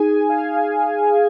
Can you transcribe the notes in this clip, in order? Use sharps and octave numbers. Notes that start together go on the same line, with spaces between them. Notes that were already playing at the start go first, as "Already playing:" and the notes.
Already playing: D#4 G#4 G#5
F5